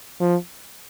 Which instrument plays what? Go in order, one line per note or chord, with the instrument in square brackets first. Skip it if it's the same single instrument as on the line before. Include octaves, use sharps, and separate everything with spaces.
[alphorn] F3